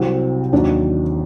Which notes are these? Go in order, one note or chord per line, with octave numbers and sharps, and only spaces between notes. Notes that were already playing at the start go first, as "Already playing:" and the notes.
Already playing: C2 C3 F#3 C4
D#2 D#3 F#3 D4